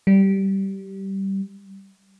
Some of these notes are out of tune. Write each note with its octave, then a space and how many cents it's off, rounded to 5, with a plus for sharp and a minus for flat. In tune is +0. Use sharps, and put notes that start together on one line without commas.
G3 -15